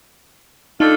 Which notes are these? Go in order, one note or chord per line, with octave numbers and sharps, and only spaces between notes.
D3 A3 D4 D#4 F4 A4